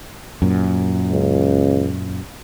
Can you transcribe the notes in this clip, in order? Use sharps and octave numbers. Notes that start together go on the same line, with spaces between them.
F#2 A#2
C#2